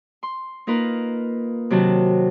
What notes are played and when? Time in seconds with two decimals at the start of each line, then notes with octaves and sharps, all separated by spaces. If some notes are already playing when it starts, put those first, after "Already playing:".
0.23 C6
0.67 A#3 D#4 F4 A#4 B4
1.70 C3 D#3 F#3 F#4 A5